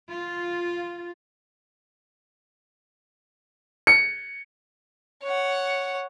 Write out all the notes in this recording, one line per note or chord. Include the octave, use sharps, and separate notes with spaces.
F4
C#7
C#5 F#5